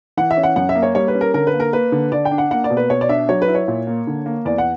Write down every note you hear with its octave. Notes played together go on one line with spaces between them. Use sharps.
E3 F#5
E5
C#4
F#5
F#2 F#5
E5
A#3
C#5
G3 C#5
B4
C#4
A#4
D3 A#4
B4
A#3
A#4
A#3 B4
D3
D3 D5
G5
D4
F#5
A#3 F#5
D5
B2
B4
B2 C#5
D5
D4 E5
F#3 C#5
B4
E4
C#5
A#2
A#3
D3
A#3
E2 D5
F#5